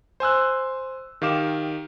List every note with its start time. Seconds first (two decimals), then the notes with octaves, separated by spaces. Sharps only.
0.20 C5 G#5 E6 F#6
1.22 D#3 G4 F5 D6 E7